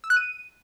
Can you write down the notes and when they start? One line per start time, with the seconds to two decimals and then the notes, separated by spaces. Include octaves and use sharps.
0.04 E6
0.10 F#6
0.16 D#7